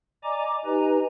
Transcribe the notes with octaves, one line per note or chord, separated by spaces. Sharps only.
D5 D#5 G#5 A#5 D6
D#4 G4 B4 D#5 G#5 A#5